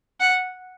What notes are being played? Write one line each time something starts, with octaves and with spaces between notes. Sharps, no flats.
F#5